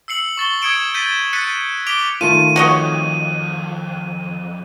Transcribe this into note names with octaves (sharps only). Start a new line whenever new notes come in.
E6 C7 C#7 F#7
C#6 A6 G7
D#6 G#6 C#7 D7 E7 G7
G6 A6 B6 D#7
F#6 A6 B6 C#7 D#7
D6 B6 D7 F7 G7
D#3 A3 F4 D#7
F2 F#4 C#5 D#5